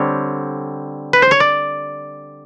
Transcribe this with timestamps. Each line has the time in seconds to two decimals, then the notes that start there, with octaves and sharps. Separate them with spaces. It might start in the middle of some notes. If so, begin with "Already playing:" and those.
Already playing: D3 G3 C4 C#5
1.13 B4
1.22 C5
1.31 C#5
1.40 D5